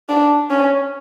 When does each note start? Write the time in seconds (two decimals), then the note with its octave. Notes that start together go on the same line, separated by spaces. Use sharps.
0.09 D4
0.50 C#4